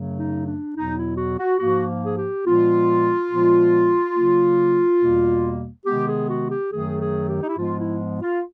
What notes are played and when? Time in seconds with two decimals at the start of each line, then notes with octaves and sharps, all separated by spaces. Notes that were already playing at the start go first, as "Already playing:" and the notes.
Already playing: F#2 C#3 F#3 A3
0.18 D#4
0.46 D4
0.75 E2 B2 F#3 B3 D#4
0.97 E4
1.18 F#4
1.39 F#4
1.60 G#2 F3 A#3 F#4
2.06 G#4
2.17 G4
2.45 A#2 F3 G#3 B3 F4
3.31 A#2 F3 G#3 B3
4.15 C#3 F#3 A#3
5.01 E2 B2 G3 A#3
5.86 C3 D#3 G#3 B3 G4
6.09 G#4
6.29 F#4
6.50 G4
6.72 F#2 D#3 F#3 A3 G#4
7.00 G#4
7.29 G4
7.41 D#4
7.49 E4
7.57 G#2 F3 G#3 B3 F4
7.79 E4
8.21 F4